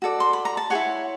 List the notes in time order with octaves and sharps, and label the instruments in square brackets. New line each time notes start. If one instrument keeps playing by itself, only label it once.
[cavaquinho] F#4 A4 D5
C6
B5
A#5
A5
G#4 C#5 F#5 G#5
E4